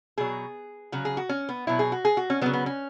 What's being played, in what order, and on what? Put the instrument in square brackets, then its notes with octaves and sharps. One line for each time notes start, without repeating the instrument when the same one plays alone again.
[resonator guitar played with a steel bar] B2 F#3 G#4
C#3 F#3 F#4
G#4
F#4
C#4
B3
B2 F#3 E4
G#4
F#4
G#4
F#4
C#4
F#3 B3
C#3
B3
C#4